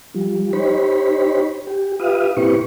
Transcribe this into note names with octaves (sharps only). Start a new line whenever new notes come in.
F3 G3
D#4 G4 C5 C#5 B5
G4
F4 G4 B4 E5 F5 D#6
A#2 C4 E4 G4 B4 C#6